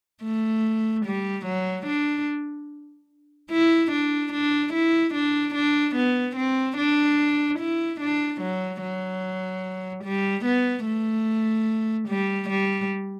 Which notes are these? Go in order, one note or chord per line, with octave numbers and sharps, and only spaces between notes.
A3
G3
F#3
D4
E4
D4
D4
E4
D4
D4
B3
C4
D4
E4
D4
F#3
F#3
G3
B3
A3
G3
G3